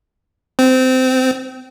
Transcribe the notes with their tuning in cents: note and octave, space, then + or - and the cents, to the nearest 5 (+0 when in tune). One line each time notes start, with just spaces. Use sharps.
C4 -20